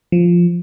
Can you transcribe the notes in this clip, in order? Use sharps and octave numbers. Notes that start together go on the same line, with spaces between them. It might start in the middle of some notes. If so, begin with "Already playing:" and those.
F3